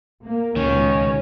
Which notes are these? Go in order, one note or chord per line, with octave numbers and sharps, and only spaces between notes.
A#3
C#2 B2 D#3 C#4